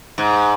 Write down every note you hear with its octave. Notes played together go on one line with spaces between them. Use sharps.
G#2